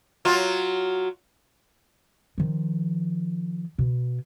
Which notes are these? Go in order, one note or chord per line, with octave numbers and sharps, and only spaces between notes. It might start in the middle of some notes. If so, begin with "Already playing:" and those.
F#3 F4
D#3 F3
B2